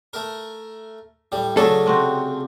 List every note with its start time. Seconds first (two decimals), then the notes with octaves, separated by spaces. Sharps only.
0.13 A3 A#4
1.32 A2 G3
1.57 C#3 F#3 A3 C#4 D4 A4
1.86 C3 C4 F#4